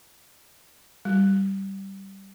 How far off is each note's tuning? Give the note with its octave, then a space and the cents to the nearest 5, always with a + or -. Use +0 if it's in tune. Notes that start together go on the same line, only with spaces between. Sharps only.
G3 -10